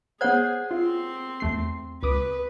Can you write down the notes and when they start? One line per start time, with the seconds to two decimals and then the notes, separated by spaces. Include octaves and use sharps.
0.21 B3 G#4 C5 C#5 F#5 G#6
0.71 C4 F4 C6
1.40 E2 A3 C7
2.03 C#2 B4 D6 D#6